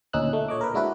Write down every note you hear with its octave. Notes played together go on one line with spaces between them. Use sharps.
D2 A#2 C#4 D#4 E6 F#6
A3
A#2 C#5 D#5 D6
A#4 B4
G#3 D4 E4 F#4 B4